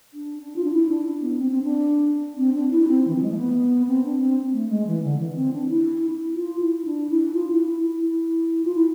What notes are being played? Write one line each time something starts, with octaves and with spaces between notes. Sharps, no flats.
D4
D4
F4
D4
E4
D4
D4
B3
C4
C4
D4
C4
D4
E4
C4
E3
F3
G#3
A3
B3
C4
D4
C4
A3
G#3
E3
D3
E3
C4
D4
E4
F4
E4
D4
E4
F4
E4
E4
F4
E4